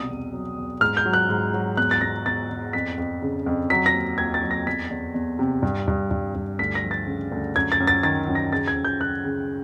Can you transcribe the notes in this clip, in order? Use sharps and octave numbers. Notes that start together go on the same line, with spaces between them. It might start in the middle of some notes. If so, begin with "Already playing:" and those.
Already playing: C2 B2 D#6
E2
F#3
E2
G#2 F6
G6
F#3
F#6
G#2
F#3
E2 F#6
A6
E2 A#6
E2 A6
E2
F2 B6
F2
C#3
F2
F#3 B6
A#6
D#2
D#2 G#6
A6
F#3
A#6
E2 B6
E2
E2
C3
G2
G2
G2
G2
D2 B6
A#6
F3
A6
C#3
D2
F#2 G#6
A6
F#2
A6
D#3 A6
F#2
A#6
C#3 A6
G#6
F#2
G6
F#2 F#6
C#3